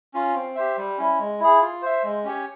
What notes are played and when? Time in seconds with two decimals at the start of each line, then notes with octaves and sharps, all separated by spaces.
0.14 C#4 F4
0.35 C4
0.55 G4 C5 E5
0.77 G3
0.98 C#4 E4
1.19 G#3
1.40 E4 G#4
1.61 F4
1.82 C5 E5
2.03 G#3
2.24 C#4 G4 C#5